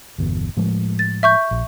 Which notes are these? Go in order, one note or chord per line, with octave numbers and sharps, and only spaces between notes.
G1 E2 B2
A2 F3 G#3
A6
E5 C#6 G6
A#1